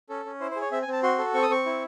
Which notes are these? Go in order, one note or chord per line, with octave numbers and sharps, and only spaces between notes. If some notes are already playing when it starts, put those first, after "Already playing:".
C#4 A4
C#4
E4 C5
C5
G#4
C#5
C4 E5
G#5
C4
A5
F#4 C6
A4
C4 C#6
D#6
C4 C#6
E4